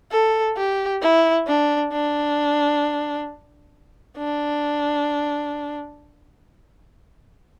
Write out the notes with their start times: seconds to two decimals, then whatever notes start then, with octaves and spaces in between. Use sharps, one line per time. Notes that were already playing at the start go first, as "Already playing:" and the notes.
0.11 A4
0.57 G4
1.02 E4
1.47 D4
1.92 D4
4.17 D4